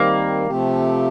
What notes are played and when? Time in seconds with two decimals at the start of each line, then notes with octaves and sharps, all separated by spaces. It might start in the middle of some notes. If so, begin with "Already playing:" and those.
Already playing: D#3 G3 A#3 C4
0.47 C3 F3 A3 C4 G4